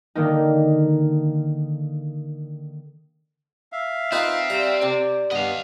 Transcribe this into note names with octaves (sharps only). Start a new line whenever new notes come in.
D3 D#3 A#3 D#4
E5 F5
C4 D#4 F4 B4
G3 A#5
C3 D5
G2 B3 D#5 F5